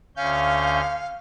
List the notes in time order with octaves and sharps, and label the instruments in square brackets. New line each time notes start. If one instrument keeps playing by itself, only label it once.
[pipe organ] D2 C#4 G6 [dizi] F5